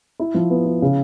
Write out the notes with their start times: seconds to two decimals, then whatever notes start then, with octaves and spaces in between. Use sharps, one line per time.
0.19 E4
0.34 F3
0.50 B3
0.65 E4
0.82 C#3